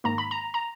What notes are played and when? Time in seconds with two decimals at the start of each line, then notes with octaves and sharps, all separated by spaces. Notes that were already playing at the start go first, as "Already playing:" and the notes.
0.04 G#2 D#3 A#3 A#5
0.18 B5
0.31 A#5
0.54 A#5